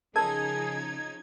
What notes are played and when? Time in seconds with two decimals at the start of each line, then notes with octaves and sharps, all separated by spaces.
0.16 C#3 F3 D#4 G#4 A#4 A5 G#6